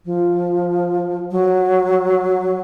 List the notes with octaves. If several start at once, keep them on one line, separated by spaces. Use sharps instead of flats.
F3
F#3